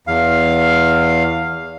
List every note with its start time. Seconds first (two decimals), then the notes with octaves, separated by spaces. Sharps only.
0.07 E2 F5